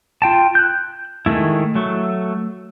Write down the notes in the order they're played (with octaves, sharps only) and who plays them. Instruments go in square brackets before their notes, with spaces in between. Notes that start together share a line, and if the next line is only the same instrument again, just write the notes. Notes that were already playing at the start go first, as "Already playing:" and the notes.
[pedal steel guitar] F4 G5 A5
F#6 G6
D#3 G#3 A3 E4
F#3 A3